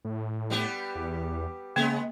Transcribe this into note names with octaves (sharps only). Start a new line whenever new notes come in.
A2
G3 B3 G4
E2
C#3 G#3 A#3 B3